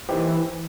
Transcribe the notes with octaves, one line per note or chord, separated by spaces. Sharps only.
E3 A#3 D#4 G4 C5